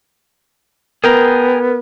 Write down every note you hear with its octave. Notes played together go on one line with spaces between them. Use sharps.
B3 G#4 A#4 G5 A#5